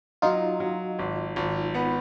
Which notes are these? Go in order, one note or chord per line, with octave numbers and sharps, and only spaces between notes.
F#3 D#4 F4
F#3
G#1
G#1
B3